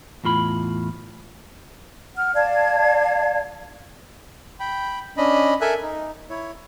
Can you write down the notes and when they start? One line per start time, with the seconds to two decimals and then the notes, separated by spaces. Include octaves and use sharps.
0.24 E2 A2 F4 B5
2.16 F#5 F6
2.35 D5 F5 A5 G#6
4.60 G5 B5
5.17 C#4 D4 D#5 B5
5.61 A4 A#4 E5 G#5 F#6
5.82 D#4
6.30 E4 C#5